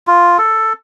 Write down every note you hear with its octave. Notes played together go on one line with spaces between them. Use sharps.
F4
A4